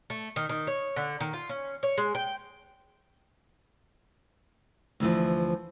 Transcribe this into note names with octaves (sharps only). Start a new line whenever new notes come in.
A3
D#3
D#3
C#5
D3
D#3
F4
C#4
C#5
G#3
G5
D2 E3 F3